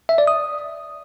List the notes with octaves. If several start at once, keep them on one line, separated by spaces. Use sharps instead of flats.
E5
D5
D#6